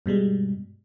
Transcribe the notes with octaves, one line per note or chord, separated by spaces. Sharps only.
G2 B2 G3 G#3